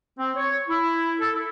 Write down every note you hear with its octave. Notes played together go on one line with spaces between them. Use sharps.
C4
C#5
E4
A4
E4